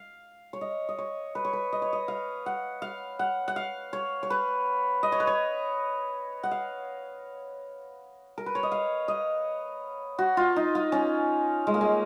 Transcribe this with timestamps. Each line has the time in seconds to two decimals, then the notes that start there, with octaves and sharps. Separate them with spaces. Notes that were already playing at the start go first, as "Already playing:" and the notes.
Already playing: F5
0.53 C#5
0.61 D#5
0.89 D#5
0.98 C#5
1.35 B4
1.45 C#5
1.53 B4
1.73 D#5
1.82 C#5
1.93 D#5
2.08 F5
2.46 F#5
2.82 F5
3.19 F#5
3.48 F#5
3.56 F5
3.93 C#5
4.23 C#5
4.30 B4
5.03 D#5
5.12 C#5
5.20 B4
5.27 C#5
6.43 F#5
6.51 F5
8.38 A#4
8.46 B4
8.55 C#5
8.63 D#5
8.72 F5
9.08 D#5
10.19 F#4
10.37 F4
10.56 D#4
10.75 F4
10.92 C#4
11.67 G#3
11.74 A#3
11.81 G#3